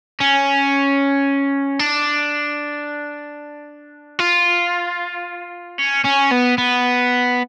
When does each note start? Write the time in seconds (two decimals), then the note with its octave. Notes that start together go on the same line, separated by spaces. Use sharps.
0.21 C#4
1.80 D4
4.19 F4
5.79 C#4
6.05 C#4
6.32 B3
6.58 B3